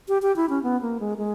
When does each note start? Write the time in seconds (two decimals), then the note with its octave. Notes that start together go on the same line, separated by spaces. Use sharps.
0.08 G4
0.22 G4
0.36 E4
0.50 C#4
0.63 B3
0.82 A#3
1.00 G#3
1.18 G#3